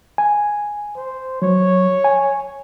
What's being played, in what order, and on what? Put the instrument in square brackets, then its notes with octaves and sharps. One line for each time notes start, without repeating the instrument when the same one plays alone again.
[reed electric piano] G#5
[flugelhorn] C5
[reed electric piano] F#3 [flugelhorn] C#5
[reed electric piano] G#5